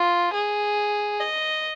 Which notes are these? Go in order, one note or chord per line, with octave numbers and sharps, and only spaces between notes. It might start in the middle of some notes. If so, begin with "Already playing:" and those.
Already playing: F4
G#4
D#5